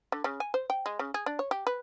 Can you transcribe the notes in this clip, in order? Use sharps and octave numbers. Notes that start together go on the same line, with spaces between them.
D3
C#3
G#5
C5
G5
G#3
C#3
G#4
D4
C#5
G4
B4